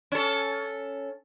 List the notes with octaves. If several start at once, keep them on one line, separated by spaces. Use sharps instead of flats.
C#4 A4